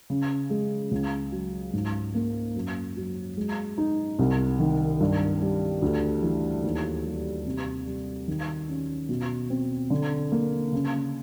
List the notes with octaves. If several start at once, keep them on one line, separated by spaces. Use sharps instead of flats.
C#3
G#3
C#2
F#3
G#2
A#3
F#2
F#3
G#3
D#4
C2
D#3
G2
G3
D2
E3
D#2
G3
C3
G3
D#3
C#4
B2
C4
D3
A#3
C#3